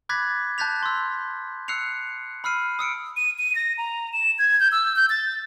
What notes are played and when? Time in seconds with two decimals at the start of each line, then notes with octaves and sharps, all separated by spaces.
0.09 B5 D6 F#6 G#6 A6 B6
0.58 A5 F#6 G6 A6 B6 F7
0.83 C6 E6
1.68 E6 F#6 C7 C#7 F7
2.44 B5 E6 F6 C7 D#7
2.79 D#6 E6 C#7 D7
3.17 D#7
3.38 D#7
3.55 A#6
3.78 A#5
4.13 E7
4.39 G#6
4.60 G6
4.72 E6
4.96 G6
5.10 A6